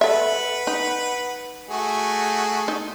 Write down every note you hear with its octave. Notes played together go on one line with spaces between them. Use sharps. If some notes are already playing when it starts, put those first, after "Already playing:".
A4 B4 E5 F#5
D#4
A3 F#4 G#4
D#4